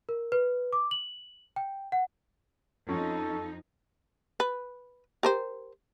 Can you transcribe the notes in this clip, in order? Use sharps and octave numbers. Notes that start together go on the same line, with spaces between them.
A#4
B4
D6
F#7
G5
F#5
F2 F3 C#4 D#4 A4
B4
G4 A#4 C5